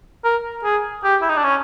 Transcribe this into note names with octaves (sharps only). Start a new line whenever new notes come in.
A#4
G#4
G4
E4
D#4
D4
C#4